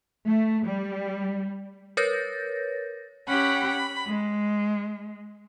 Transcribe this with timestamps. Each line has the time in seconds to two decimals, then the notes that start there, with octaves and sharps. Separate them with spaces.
0.24 A3
0.65 G3
1.97 A#4 B4 C#5 G6 A6 A#6
3.28 C#4 G4 F#5 G5 B5
3.68 B5
4.06 G#3